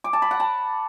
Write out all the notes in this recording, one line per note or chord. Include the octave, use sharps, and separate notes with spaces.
D6
A5
B5
F#5
A5